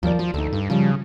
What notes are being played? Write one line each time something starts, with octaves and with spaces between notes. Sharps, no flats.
D#2 F3 A#4 D5
F3 F4
D2 D#4 A4
G2
C#3 F3 G3